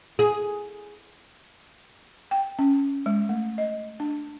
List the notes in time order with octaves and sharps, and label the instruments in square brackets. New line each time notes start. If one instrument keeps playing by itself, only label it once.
[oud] G#4
[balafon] G5
C#4
G#3
A3
D#5
D4